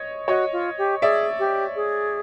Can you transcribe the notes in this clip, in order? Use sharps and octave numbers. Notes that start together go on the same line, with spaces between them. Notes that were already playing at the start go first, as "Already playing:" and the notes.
Already playing: C#5 D#5
F#4 C#5 D#5
F4
G4
G#4 D5 E5
G4
G#4